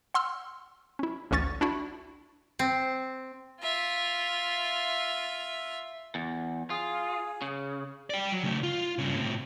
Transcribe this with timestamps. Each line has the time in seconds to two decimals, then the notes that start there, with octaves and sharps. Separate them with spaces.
0.14 F#5 C6 E6 F6
0.99 C#4 E4
1.31 A1 D2 C#4 C#6 A6
1.61 D4 E4 F#4
2.59 C4
3.61 F4 E5
6.15 E2
6.70 F4 G#4
7.42 C#3
8.10 D5 G5
8.32 F#3
8.43 C#3 A3
8.63 F4
8.98 G2 C#3
9.15 A2 C3